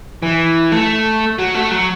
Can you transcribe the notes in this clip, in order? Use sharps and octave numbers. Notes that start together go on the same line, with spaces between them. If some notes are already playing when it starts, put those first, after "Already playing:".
E3
A3
F#3
A3
F#3